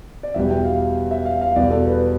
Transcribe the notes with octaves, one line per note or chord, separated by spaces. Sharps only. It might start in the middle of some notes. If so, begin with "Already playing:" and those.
D5
E2 B2 G3 E5
G5
F5
E5
F5
F5
E2 B2 G3 D5
A4
B4